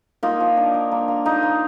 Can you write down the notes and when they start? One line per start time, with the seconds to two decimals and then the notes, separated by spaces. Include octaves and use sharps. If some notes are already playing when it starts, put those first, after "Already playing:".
0.23 A#3 D#4 F4
0.40 F3
0.57 D4
0.74 D4
0.92 A#3
1.08 A#3
1.25 A#3 D#4 F4
1.43 F3